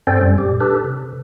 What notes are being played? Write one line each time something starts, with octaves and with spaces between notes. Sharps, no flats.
G2 C4 C#4 A4 C5 D5
F#2 G3
A#2 G4
D4 G4 A4 B4
C3